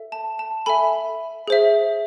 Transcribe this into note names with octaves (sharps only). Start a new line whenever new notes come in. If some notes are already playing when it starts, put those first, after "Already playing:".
Already playing: A4 E5
A5
A5
A4 E5 G#5 B5
G#4 C5 E5